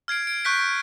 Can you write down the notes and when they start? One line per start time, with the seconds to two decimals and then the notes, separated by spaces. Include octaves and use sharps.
0.08 F6 G#6 C7 D7
0.27 D7
0.45 C#6 F#6 G6 B6 D7